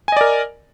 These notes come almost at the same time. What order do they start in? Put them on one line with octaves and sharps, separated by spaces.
G#5 D#5 D5 A#4